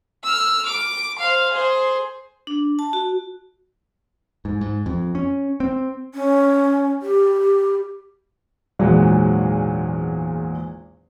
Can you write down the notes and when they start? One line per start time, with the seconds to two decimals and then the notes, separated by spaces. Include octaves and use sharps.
0.24 E6 F6
0.66 D6
1.19 C5 F5
1.52 G#4 C5
2.47 D4
2.79 A5
2.93 F#4
4.45 G#2
4.61 G#2
4.86 F2
5.15 C#4
5.60 C4
6.15 C#4
7.02 G4
8.79 G#1 E2 A#2 F#3 G#3